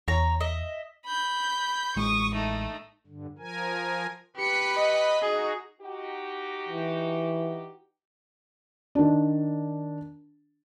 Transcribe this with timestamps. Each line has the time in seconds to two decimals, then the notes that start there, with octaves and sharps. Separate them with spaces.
0.08 E2 C#5 A#5
0.40 D#5 E5
1.06 B5 G6
1.96 A1 G#3 C#6 D#6
2.34 A3 D#4
3.07 G2 D3
3.38 F3 A#4 G#5
4.36 G4 B4 B5 C#7
4.76 D#5
5.22 D#4 F#4 G#4
5.81 D#4 F#4 G4
6.69 E3
8.95 D#3 D4